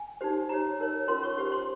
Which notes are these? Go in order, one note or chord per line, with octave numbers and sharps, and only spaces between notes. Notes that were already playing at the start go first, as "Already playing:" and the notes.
Already playing: G#5
D#4 G4 C5
D#4 G4 C#5 A#5
D#4 A#4 C#5
C#4 F4 A#4 C#5 C6
C#6
C#4 G4 C5 C#6
C6